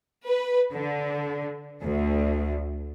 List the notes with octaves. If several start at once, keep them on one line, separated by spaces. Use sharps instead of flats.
B4
D3
D2